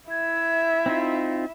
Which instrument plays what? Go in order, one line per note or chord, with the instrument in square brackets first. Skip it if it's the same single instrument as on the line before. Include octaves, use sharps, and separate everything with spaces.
[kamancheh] E4 E5 [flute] G#6
[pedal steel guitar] C4 D#4 F4